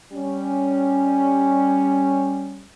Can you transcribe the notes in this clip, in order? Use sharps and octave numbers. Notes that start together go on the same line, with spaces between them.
G3 C#4